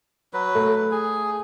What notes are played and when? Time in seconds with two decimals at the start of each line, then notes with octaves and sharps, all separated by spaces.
0.33 F#3 B4
0.55 A3
0.91 G#4